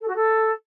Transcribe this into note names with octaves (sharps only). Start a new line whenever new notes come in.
A4
F#4
A4